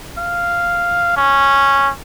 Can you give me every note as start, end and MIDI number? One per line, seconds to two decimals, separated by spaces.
0.18 1.13 77
1.17 1.90 61